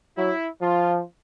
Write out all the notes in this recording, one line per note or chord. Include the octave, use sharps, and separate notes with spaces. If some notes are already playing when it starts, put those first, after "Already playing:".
F#3 E4
F3 F4